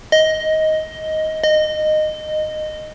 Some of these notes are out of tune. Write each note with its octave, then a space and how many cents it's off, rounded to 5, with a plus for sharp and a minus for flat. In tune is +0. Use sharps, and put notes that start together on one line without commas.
D#5 +10
D#5 -15